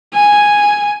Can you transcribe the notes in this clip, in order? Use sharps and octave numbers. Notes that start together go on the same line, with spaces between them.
G#5